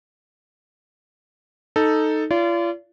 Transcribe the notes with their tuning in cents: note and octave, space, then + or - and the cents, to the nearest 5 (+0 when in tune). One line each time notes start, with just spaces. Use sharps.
D#4 +0 A4 +0
F4 -35 D5 -35